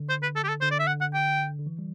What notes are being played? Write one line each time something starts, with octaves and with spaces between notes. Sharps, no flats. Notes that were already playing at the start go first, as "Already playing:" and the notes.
Already playing: D3
C5
B4
A4
G4
A4
D3 C5
D5
E5
F#5
F#5
G5
D3
E3
G3